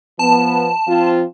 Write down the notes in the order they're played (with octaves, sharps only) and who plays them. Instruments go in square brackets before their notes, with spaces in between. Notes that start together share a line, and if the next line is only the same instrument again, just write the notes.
[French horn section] F3 B3 [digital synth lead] A5
[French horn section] F3 C4 F4